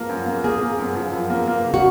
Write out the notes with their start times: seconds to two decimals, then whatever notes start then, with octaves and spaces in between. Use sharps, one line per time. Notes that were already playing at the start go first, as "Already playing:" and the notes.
Already playing: F3 A#3
0.09 F#2
0.26 A#3
0.44 A#3 G#4
0.61 A#3
0.78 F#2
0.96 F3
1.13 F#2
1.30 A#3
1.47 A#3
1.65 C#3
1.74 F#4